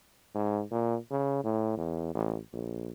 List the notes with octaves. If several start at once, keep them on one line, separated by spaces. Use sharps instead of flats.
G#2
A#2
C#3
A2
E2
A1
A#1